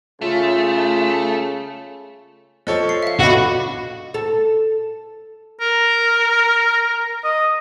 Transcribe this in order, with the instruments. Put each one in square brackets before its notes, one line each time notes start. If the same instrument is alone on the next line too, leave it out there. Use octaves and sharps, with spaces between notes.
[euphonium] C#3 [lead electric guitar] A3 [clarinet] F4
[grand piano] F3 A4 C#5 [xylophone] D#5 C#6
[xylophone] C7
E5 F5
[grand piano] B3 D4 [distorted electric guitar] F#4 [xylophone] A4 D#5 B5
[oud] A4
[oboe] A#4
D#5